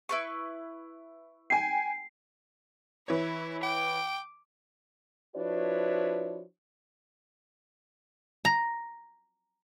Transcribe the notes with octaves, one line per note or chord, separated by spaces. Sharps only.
E4 B4 C#6
G5 G#5 C7
E3 E4 C#5
G5 D6
F3 D4 E4 F#4 B4 C#5
A#5